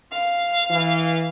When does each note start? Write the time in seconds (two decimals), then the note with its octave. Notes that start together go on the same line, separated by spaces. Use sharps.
0.12 F5
0.70 E3